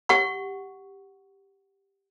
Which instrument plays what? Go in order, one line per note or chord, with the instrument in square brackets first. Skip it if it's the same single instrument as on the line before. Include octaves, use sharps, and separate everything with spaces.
[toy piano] G4 F#5 C#6